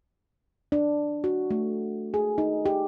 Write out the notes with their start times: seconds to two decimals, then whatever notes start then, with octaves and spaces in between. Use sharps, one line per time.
0.72 D4
1.24 F#4
1.51 A3
2.14 G#4
2.38 D#4
2.66 G4